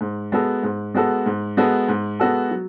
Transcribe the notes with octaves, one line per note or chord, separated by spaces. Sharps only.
G#2
G#3 B3 F#4 A4
G#2
G#3 B3 F#4 A4
G#2
G#3 B3 F#4 A4
G#2
G#3 B3 F#4 A4
F#3